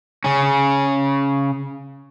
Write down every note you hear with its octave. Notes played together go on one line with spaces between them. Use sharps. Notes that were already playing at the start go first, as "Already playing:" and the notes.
C#3 C#4